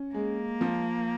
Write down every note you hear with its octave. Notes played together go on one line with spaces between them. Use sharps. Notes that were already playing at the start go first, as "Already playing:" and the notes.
Already playing: C#4
G#3 A#3
F3